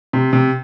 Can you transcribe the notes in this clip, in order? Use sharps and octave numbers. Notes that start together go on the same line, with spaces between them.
C3
C3